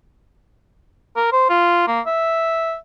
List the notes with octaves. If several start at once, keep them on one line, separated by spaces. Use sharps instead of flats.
A#4
C5
F4
A#3
E5